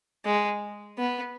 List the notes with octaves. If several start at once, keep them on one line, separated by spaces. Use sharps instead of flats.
G#3
B3